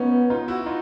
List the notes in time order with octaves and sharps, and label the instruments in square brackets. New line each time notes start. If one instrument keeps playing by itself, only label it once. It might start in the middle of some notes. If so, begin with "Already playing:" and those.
Already playing: [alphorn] B3 [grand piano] C#4 D#4
[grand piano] D#4 F4
E4 F#4
D#4 F4